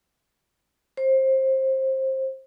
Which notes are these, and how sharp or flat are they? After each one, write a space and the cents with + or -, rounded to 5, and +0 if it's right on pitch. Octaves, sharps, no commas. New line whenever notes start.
C5 +20